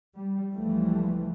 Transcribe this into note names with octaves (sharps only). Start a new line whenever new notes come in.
G3
C#2 E3 F3 G3 A3